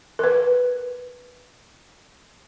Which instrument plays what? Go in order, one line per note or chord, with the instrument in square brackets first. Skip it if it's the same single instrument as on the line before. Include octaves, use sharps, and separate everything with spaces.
[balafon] A#4 B4